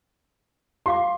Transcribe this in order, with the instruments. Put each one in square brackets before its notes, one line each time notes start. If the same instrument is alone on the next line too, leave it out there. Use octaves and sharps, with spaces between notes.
[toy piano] G4 F5 D6 [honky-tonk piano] C6